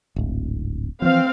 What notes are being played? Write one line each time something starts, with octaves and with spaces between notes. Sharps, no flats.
D1 G#1
E3 F3 C4 F5